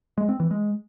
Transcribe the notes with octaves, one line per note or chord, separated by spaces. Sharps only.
G#3
C4
E3
G#3